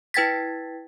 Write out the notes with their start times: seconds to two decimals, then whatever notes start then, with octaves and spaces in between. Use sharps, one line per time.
0.14 E4 B4 G5 G#6 A6 B6